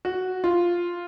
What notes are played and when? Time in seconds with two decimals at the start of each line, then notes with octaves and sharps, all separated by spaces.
0.05 F#4
0.44 F4